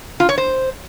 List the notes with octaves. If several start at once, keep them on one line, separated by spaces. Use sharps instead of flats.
F4
C#5
C5